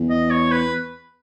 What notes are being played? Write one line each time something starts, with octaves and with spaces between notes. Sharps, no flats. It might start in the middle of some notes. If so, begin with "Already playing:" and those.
Already playing: E2
D#5
C#5
B4